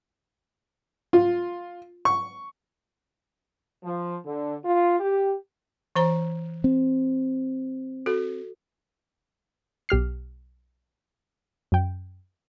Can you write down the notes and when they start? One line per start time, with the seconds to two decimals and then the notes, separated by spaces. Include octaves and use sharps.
1.13 F4
2.05 C#6
3.84 F3
4.26 D3
4.65 F4
5.00 G4
5.96 E3 C5 A#5
6.64 C4
8.06 F#4 A4
9.89 B1 G4 F6 C7
11.72 F#2 G5